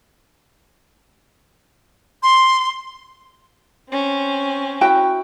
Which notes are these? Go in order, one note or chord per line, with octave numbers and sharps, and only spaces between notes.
C6
C4 C#4
E4 F#4 G5